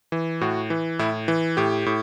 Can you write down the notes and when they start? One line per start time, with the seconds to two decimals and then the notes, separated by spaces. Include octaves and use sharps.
0.12 E3
0.41 A2 F#4
0.70 E3
0.99 A2 E4
1.28 E3
1.57 A2 G4
1.86 A2